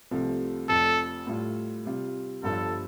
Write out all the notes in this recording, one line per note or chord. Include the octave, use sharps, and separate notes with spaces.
C2 C3 F3 A3
F1 F2 F3 A4
A2 G3 F4
C3 G3 F4
G1 G2 F3 A4